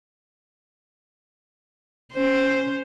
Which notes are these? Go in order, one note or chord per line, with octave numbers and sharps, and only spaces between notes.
C#4 C5